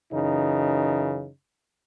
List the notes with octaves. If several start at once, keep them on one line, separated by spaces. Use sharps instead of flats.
F#2 C#3 E3 D#4